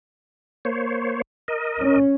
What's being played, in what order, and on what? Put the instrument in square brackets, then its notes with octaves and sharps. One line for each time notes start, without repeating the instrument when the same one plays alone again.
[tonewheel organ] A#3 C5 C#5
A#4 D#5
[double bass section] C#4